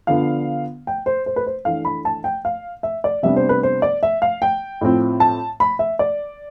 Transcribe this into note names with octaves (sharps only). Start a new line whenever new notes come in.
D3 F3 B3 D4 F5
G5
C5
C5
B4
C5
E3 A3 D4 F5
B5
A5
G5
F5
E5
D5
C3 G3 B3 D4 E5
C5
B4
C5
D5
E5
F5
G5
A2 F3 C4
A5
B5
E5
D5